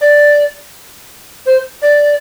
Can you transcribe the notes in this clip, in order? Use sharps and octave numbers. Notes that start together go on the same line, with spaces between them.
D5
C5
D5